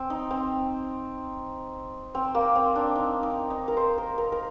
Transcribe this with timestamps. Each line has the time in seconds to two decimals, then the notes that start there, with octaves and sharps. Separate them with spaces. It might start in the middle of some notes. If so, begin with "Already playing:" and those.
Already playing: C4
0.10 D#4
0.31 C4
2.15 C4
2.35 A#3
2.55 C4
2.75 D4
2.96 D#4
3.23 D#4
3.50 D#4
3.68 A#4
3.77 C5
3.98 A#4
4.18 A#4
4.32 A#4